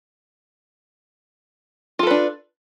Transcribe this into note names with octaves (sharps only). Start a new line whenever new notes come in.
D4 F4 A4 B4